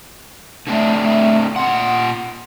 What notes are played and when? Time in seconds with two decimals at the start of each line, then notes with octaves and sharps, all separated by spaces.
0.67 D3 A3 C4 D4
1.02 A3
1.56 A#2 F#5 C6